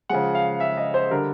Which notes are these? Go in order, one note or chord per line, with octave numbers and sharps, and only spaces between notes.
C#3 F3 G#3 F#5
F5
E5
D#5
C5
D3 G3 A#4